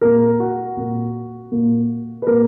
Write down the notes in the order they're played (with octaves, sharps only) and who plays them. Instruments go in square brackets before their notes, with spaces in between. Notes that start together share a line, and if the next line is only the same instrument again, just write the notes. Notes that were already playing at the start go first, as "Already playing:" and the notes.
[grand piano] A#2 A#3 A#4
F#4
A#2 A#3
A#2 A#3
B4
A#2 A#3 A#4